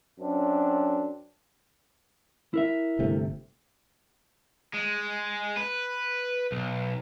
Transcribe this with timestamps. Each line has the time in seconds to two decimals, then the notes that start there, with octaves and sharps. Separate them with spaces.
0.20 F#2 C4 D4
2.54 E4 A#4 E5
2.99 G1 C3 A3
4.74 G#3
5.57 B4
6.52 B1